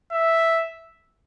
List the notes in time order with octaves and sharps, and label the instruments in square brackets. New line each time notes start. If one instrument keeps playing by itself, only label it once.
[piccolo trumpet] E5